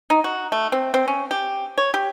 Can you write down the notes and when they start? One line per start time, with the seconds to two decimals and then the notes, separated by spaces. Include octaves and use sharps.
0.10 D#4
0.24 F#4
0.52 A3
0.72 C4
0.94 C4
1.08 C#4
1.31 G4
1.78 C#5
1.94 G4